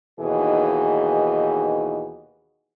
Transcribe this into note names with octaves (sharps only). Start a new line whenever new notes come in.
D#2 B2 E3 D#4 G#4